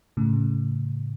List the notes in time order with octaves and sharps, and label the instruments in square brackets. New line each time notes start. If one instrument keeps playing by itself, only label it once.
[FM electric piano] A2 C#3